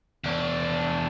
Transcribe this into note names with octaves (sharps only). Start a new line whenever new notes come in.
E2 D4